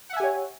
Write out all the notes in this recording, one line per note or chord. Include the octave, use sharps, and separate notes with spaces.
G4 C#5 E5 F#5 G#5